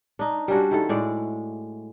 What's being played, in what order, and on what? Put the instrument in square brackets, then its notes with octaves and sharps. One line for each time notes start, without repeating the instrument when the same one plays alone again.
[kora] D4 D#4
G3 C#4 D4 F#4
D#3 E4 A4
A2 G#3 D5